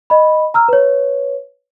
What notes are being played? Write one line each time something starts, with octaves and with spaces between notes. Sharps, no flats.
D#5 B5
A#5 E6 F6
B4 C#5